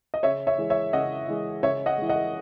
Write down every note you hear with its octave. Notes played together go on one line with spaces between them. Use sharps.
D#5
C#3 C#5 E5
C#5 E5
E3 G#3
C#5 E5
C#3 D#5 F#5
E3 G#3
C#3 C#5 E5
D#5 F#5
E3 G#3
D#5 F#5